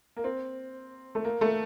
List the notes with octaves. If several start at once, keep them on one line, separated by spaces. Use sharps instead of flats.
A#3
C4
A3
A#3
A3